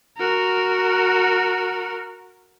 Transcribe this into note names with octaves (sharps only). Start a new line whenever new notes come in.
F#4 A#4